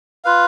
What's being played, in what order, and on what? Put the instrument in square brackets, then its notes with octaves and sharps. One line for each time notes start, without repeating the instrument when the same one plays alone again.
[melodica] F4 B4 F5